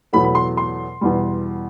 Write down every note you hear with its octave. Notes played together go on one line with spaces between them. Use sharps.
E2 B2 F#3 A3 B5
B5
C6
C6
E2 B2 G3